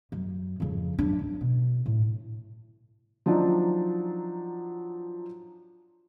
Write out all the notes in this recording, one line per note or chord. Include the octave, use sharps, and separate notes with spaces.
F#2
F2 C#3
F#3 D4
F#2
B2
A2
F3 F#3 D4 D#4